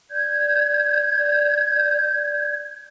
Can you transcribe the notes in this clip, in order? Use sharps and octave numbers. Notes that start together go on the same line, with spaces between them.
D5 G6 G#6